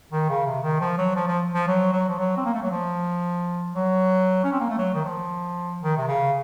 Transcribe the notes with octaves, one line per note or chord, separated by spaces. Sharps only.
D#3
C#3
C3
D#3
F3
F#3
F3
F3
F3
F#3
F#3
F3
F#3
C4
A#3
A3
F#3
F3
F#3
C#4
C4
A#3
A3
F#3
D#3
F3
D#3
C3
C#3